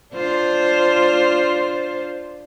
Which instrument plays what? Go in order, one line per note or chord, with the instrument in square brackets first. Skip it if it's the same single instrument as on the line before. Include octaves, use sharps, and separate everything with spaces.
[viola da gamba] D4 F4 C5